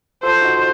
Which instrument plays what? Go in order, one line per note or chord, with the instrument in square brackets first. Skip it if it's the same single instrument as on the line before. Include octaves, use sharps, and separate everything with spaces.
[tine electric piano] F4 A4 [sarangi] C5
[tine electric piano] D#4 F#4